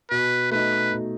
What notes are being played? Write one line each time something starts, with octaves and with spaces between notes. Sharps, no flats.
B2 B4
A3 D#4 B4
B2